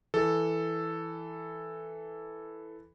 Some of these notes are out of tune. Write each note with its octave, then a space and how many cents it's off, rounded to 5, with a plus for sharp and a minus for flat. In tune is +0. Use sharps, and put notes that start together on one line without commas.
E3 +0 A4 +0